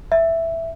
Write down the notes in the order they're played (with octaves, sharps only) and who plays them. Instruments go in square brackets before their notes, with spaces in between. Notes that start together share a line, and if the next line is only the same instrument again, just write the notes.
[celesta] E5